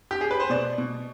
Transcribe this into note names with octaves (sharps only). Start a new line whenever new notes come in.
G4
G#4
B4
C5
B2 D5
B2